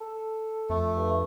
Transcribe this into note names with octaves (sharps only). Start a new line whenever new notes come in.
A4
F2 A3
G2